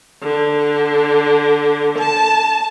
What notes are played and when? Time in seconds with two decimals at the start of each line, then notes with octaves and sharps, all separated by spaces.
0.23 D3
1.99 A5